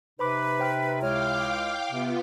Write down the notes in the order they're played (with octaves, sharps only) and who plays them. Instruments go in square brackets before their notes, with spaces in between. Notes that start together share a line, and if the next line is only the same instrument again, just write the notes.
[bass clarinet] C3 [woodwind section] D#4 B4 [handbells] C5 B5 D6
[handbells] C5 G5 F6
[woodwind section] C#2 G#3 F6 [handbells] E4 C#5 [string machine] F5 G5 D6
[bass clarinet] C3 [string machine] B3 F4